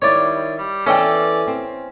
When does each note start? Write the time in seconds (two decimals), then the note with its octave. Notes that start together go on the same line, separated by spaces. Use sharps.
0.02 D#3 G3 E4 C#5 D5
0.58 G3
0.86 E3 B3 C#4 A4 D5 D#5 G5
1.47 C4